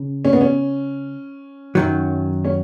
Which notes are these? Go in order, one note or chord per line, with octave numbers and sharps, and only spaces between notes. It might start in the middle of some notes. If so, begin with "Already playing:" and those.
Already playing: C#3
C#4
B3
C#4
F#2 D#3 F#3
C#4